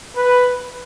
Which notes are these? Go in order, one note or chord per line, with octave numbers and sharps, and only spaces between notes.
B4